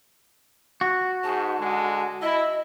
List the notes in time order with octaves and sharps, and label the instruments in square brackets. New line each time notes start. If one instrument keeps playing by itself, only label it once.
[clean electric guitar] F#4
[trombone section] G#2 [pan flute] A5
[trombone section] D3 G#3
[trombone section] E4 [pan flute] D#5